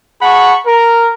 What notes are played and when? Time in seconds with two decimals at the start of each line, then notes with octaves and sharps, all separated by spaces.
0.22 G#4 F#5 A5 B5 C#6
0.66 A#4